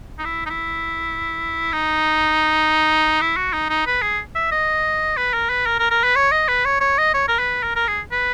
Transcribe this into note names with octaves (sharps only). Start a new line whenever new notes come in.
D#4
E4
D#4
E4
D#4
E4
F#4
D#4
D#4
B4
G#4
E5
D#5
B4
A#4
B4
A#4
A#4
A#4
B4
C#5
D#5
B4
C#5
C#5
D#5
C#5
A#4
B4
A#4
A#4
G#4
B4